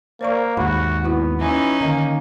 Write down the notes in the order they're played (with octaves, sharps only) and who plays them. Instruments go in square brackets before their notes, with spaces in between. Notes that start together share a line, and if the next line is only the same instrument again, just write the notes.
[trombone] A#3 [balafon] C5 D5 C#6
[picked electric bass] D#2 G#2 [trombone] F#4 [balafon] B5
[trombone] B3 [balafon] E4 F#4
[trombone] E3 [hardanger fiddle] C#4 D#4
[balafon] D3 D#5 [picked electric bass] D#3 [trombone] A#3